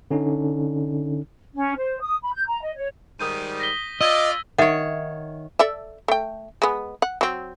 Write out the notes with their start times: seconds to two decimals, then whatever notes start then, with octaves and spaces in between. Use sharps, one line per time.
0.11 D3 C#4 D#4
1.56 C#4
1.76 C5
2.01 D#6
2.22 B5
2.34 G6
2.46 A#5
2.62 D#5
2.76 C#5
3.19 G#2 D#3 G3 D#6 G6 D#7
3.60 A#6 B6 G7
4.01 F4 D5 D#5 E6 G#6 A#6
4.58 D#3 C#5 E5 F#5
5.59 A4 D5 E5
6.08 A3 G5
6.62 G#3 B3
7.02 F#5
7.21 F#3 C4